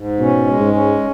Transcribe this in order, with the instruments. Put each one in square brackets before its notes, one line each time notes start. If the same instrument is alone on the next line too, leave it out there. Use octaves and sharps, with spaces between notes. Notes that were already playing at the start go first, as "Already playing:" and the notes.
Already playing: [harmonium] G#2
[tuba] B2 [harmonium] C#4
[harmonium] G#3
[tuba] G#2
[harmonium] C#4